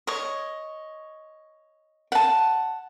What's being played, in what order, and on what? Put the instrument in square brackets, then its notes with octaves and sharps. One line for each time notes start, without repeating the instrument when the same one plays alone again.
[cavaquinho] C#5 D#5
F#5 A5